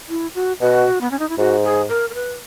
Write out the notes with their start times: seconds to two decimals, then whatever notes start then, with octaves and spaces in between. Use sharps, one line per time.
0.09 E4
0.35 F#4
0.60 B2 F#4
1.01 B3
1.11 C#4
1.19 D#4
1.29 E4
1.38 G#2 F#4
1.64 G#4
1.89 A#4
2.10 A#4
2.14 B4